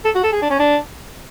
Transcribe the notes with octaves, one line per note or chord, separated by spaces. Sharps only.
A4
F#4
A4
G#4
D4
C#4
D4